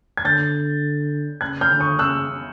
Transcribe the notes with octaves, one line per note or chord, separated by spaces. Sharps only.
G#6
D3 G6 A6
C#3 F#6 G#6
F6 G6
D3
C#6 D#6
C#3 E6 F#6